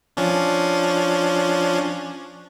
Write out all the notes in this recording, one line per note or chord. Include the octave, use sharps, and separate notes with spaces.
F3 C#4 D4